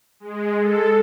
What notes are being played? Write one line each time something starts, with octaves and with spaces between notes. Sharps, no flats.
G#3
A4